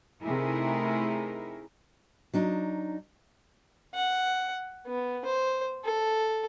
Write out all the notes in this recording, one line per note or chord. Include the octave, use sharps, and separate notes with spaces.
C3 A3 D#4 E4 G#4 A#4
F#3 D4 D#4
F#5
B3
C5
A4